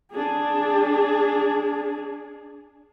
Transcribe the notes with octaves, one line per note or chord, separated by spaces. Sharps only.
D4 G#4